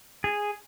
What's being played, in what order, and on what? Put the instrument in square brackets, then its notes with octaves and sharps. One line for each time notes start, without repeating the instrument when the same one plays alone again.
[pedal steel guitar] G#4